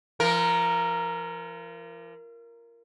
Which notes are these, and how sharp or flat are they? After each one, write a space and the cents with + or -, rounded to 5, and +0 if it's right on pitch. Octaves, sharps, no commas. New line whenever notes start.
F3 -40 A#4 +0